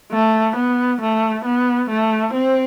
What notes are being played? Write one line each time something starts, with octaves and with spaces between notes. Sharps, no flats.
A3
B3
A3
B3
A3
C4